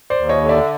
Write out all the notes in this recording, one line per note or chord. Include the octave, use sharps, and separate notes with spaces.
C5 D5
D#2
C#5 D#5
D3
D5 E5